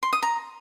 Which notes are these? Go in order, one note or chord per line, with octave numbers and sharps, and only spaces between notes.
C6
D#6
A#5